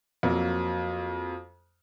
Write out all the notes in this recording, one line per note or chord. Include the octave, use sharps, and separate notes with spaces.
F2 F#3 A#3